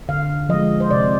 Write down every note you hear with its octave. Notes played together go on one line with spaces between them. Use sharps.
D3 F5
F3 G#3 D#5
C5
C3 D5